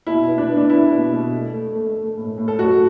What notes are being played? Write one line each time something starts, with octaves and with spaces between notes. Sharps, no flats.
B2 E4
B3
D4
B3
D4
B3 E4
B2
B2
A3
A3
A3
A3
A2
A2
A4
F#2 F#4